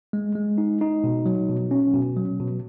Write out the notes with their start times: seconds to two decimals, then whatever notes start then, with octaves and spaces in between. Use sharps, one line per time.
0.13 G#3
0.35 G#3
0.58 D#4
0.81 D#4
1.04 B2
1.26 F#3
1.49 B2
1.71 C#4
1.94 B2
2.17 F#3
2.40 B2